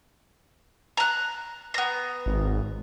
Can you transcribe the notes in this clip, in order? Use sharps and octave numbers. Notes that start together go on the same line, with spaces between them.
A#5 F#6
B3 A#5
G#1